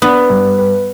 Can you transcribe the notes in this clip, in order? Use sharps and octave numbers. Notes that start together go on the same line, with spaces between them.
B3 D4
G2
B4